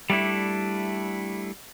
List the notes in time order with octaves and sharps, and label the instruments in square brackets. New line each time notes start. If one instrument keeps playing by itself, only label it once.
[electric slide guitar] G3 A3 D4 E4